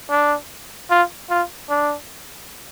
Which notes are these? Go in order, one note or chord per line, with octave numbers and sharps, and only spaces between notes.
D4
F4
F4
D4